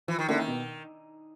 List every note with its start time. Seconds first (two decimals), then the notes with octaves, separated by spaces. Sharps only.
0.08 E3 F3
0.19 D#3
0.28 D3 A#3 C#4 E4
0.38 D#3
0.48 B2